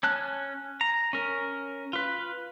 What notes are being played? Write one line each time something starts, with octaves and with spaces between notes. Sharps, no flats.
C#4 A5 F#6
A#5
C#4 A#4
F4 B4